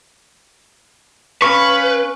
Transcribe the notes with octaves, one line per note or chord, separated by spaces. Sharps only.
C#4 B4 F5 C#6